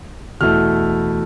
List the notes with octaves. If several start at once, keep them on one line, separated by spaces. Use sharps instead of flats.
E2 B2 A3 E4 F6